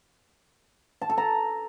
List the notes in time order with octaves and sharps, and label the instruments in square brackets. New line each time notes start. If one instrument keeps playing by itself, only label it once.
[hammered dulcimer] A5
A4
A#5